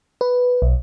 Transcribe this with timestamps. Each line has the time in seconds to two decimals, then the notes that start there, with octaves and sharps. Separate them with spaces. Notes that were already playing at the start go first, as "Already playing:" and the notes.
0.21 B4
0.62 B1